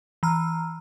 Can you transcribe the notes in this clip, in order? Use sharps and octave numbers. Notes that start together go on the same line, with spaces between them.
E3 A#5 F6